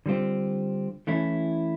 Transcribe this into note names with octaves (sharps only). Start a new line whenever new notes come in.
D3 G3 C4 F4
E3 A3 C#4 E4